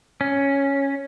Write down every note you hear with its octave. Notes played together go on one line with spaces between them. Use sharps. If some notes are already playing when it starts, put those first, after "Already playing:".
C#4